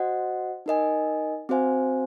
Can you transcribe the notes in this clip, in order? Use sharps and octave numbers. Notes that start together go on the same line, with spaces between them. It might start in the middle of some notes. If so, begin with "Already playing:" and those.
Already playing: F#4 C5 D#5 F#5
D#4 A#4 D#5 G#5
C4 F#4 C5 F5 G#5